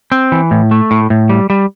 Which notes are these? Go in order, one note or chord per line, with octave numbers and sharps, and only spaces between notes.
C4
E3
A2
A3
A2
A2
G3
G3